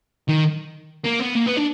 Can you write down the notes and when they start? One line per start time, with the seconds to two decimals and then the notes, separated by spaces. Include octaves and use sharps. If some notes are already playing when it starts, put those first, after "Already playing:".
0.29 D#3
1.06 A#3
1.21 B3
1.37 A#3
1.47 B3
1.57 D4